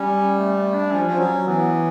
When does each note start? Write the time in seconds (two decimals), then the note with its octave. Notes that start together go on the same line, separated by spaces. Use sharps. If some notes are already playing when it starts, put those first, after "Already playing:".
Already playing: G3 C#4
0.38 A3
0.56 A3
0.74 D4
0.91 F3 C#4
1.06 F3
1.18 F#3
1.46 E3 B3